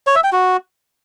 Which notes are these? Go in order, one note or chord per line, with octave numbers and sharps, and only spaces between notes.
C#5
E5
G5
F#4